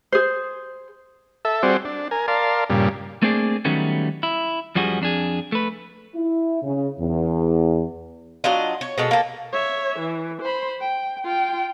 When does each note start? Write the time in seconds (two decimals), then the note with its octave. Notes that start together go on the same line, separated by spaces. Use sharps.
0.12 G#4 C5
1.45 A4 E5
1.63 G3 C4 F#4 G#4 C5 D5
1.85 D4
2.11 A#4 G#5
2.28 A#4 D5 F5 A5 C6
2.70 G2 A#2 C#3 G3
3.22 A3 A#3 C4 D4 G#4 D5
3.65 D#3 F#3 G3 A3 B3 C#4
4.23 E4
4.75 F#2 F3 G3 F#4 G#4
5.01 F2 D4 G#4
5.52 A3 B4
6.14 E4
6.62 C#3
7.00 E2
8.44 F#3 D4 F4 D#5
8.81 C#5
8.98 B2 G#3 A4
9.11 A#3 A4
9.53 C#5 E5
9.99 E3
10.42 C5 B5
10.81 G5
11.25 F4 G5